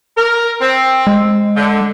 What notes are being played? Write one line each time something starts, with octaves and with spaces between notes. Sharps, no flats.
A#4
C4
G#3
D3